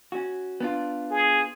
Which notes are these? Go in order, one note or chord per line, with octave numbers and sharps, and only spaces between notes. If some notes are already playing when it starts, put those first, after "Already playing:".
C#4 F#4
B3 D4 F4
G#4